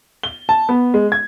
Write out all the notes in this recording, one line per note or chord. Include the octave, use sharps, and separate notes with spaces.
G7
A5
B3
G#3
G#6